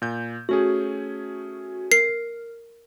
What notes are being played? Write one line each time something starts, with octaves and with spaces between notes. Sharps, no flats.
A#2 G6
A3 C#4 F#4 G#4
A#4 C7